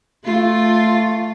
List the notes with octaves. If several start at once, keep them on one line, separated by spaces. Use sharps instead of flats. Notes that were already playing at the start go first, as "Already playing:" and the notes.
A3 F4